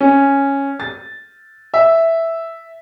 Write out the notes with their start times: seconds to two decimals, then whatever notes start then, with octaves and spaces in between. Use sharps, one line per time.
0.01 C#4
0.80 A6
1.74 E5